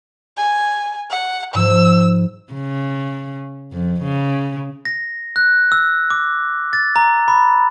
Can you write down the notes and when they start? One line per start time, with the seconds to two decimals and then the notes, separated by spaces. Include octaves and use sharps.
0.37 G#5
1.10 F#5
1.54 G#2 F3 E6
2.53 C#3
3.73 F2
4.02 C#3
4.85 A#6
5.36 F#6
5.72 E6
6.10 D6
6.73 A6
6.96 A#5
7.28 B5